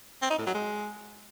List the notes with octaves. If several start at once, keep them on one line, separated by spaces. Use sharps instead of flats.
C4
D#4
A2
F#3
G#3